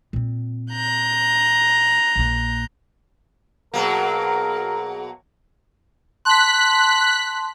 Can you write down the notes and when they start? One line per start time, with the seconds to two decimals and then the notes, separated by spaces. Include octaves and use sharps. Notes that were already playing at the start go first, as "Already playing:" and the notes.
0.13 A#2 C4
0.71 A#5 F#6 G6
2.15 A#1 A#3
3.74 B2 F#3 A#3 G#4 A#4
6.25 A5 C6 F#6 B6